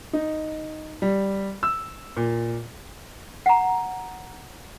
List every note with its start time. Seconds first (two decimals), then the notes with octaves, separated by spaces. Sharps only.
0.13 D#4
1.02 G3
1.63 E6
2.17 A#2
3.46 F#5 A#5